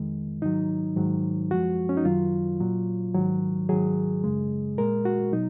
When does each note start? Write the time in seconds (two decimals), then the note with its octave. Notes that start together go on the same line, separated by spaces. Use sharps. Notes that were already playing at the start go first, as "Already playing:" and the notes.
Already playing: F2 D#3 G#3
0.41 G#2 D#3 F#3 D#4
0.96 G#2 D#3 F#3
1.51 F#2 F3 G#3 F#4
1.89 C#4
1.97 D#4
2.05 F#2 D#3 F#3 F4
2.60 A#2 F#3
3.15 G#2 D#3 F#3
3.69 G#2 D#3 F#3 G#4
4.24 F#2 C#3 G#3
4.78 A#2 G#3 A#4
5.05 F#4
5.32 B2 F#3 D#4